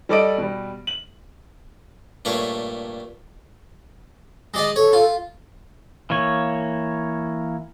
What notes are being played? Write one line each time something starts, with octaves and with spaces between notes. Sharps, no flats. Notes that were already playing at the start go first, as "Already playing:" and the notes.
G3 A4 D5 D#5 D7
B2 G3
F#7
G2 A#2 A3 C#5
G#3 D5 D#5
A4 C#5
F4
E3 A#3 C#5